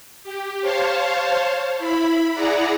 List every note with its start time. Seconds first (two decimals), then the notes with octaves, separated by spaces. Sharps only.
0.23 G4
0.61 C5 C#5 F5 A5
1.78 E4 B5
2.33 E4 G#4 D5 F#5 A#5